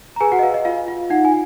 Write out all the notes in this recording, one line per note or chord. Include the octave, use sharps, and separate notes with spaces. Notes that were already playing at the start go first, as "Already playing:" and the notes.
A#5
G#4 B4 G#5
F#4 F#5
D#5
B4 F5
D#5
F4 F5
F4
D#4 F#5
G#5